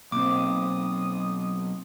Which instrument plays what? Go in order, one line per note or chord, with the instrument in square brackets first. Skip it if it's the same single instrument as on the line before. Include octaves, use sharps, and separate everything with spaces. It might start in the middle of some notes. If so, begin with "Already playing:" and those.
[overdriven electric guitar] B1 [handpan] A#3 C4 [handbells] D6 [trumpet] D#6